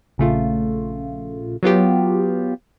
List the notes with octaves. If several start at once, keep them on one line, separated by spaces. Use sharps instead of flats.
A#1 C#3 A3 F4
F#3 B3 F4 G4